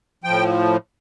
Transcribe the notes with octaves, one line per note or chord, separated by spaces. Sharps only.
A2 F3 G5